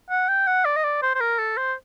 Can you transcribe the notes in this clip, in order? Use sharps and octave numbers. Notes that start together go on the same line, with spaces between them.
F#5
G5
F#5
D5
D#5
D5
C5
C5
A#4
A4
C5